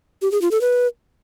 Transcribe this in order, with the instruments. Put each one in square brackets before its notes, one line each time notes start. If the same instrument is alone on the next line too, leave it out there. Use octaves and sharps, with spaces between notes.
[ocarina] G4
G#4
F4
A4
B4